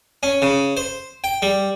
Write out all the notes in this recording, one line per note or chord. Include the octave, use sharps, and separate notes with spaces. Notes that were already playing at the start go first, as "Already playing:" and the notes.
C#4
C#3
C5
G5
G3